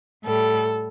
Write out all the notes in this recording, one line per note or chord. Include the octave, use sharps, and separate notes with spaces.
A2 G3 A4